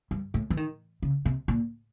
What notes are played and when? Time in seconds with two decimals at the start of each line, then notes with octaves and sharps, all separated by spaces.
0.11 G2
0.34 A2
0.50 E3
0.57 D#3
1.02 C#3
1.25 C3
1.48 A#2